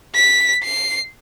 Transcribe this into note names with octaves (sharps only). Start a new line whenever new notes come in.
B6
C7